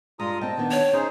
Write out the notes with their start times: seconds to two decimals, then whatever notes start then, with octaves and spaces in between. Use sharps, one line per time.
0.19 G2 G#3 F4 A#5 D#6
0.41 C4 D#5 G5 A5
0.57 D#3 B3 D4
0.72 C#5
0.93 C#4 D#4 G#4 C5